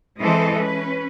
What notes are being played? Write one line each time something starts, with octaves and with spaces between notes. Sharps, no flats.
E3 G#3 C4 A4 C5 D#5
C#4 B4